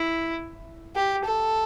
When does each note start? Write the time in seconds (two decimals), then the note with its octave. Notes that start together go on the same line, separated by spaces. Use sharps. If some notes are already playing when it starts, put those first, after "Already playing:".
Already playing: E4
0.95 G4
1.25 A4